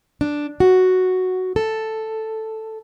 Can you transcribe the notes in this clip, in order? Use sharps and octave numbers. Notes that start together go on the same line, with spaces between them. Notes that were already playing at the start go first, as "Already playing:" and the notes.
D4
F#4
A4